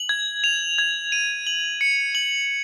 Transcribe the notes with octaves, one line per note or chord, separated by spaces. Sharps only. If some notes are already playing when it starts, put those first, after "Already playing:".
Already playing: F#7
G#6
F7
G#6
D#7
F#7
C#7
F#7